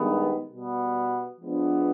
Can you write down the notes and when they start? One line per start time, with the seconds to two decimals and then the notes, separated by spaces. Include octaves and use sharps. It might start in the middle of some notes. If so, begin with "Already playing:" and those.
Already playing: G2 D#3 G#3 B3
0.51 B2 G3 B3
1.40 F3 G#3 B3 D4